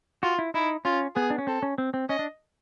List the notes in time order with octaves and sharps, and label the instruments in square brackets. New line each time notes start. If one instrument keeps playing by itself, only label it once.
[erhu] F4 [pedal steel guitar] F#4
[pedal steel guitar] E4
[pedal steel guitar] D#4 [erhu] E4
[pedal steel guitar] C#4 [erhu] F4
[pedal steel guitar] B3 [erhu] G#4
[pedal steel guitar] D4
C#4
[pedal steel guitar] C4 [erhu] A4
[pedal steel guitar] C#4
C4
C4
[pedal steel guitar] C#4 [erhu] D#5
[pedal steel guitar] D4